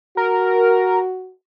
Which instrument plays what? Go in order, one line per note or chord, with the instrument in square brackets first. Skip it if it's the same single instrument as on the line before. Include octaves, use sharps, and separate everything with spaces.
[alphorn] F#4 [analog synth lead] A#4